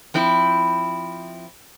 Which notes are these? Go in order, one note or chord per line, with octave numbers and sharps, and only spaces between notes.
F3 C4 E4